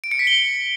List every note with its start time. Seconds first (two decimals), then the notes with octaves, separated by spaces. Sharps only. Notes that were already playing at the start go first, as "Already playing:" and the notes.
0.04 D7
0.11 C#7
0.19 B6
0.27 G7